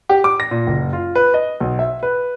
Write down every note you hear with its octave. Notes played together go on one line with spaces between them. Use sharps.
G4
D6
A#6
A#2
F#1
F4
B4
D#5
B1
E5
B4